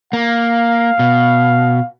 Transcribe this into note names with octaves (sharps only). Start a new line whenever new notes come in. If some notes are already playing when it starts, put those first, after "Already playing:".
A#3 F5
B2